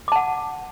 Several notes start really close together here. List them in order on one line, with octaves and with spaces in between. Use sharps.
D6 A5 F#5